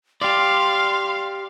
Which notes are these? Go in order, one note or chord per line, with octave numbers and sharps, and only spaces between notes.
G4 D5 F5 C6